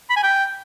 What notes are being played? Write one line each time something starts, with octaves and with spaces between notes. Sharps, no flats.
B5
G#5
G5